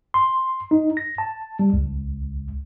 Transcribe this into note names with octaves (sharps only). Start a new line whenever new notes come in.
C6
D#4
A#6
A5
G3
C#2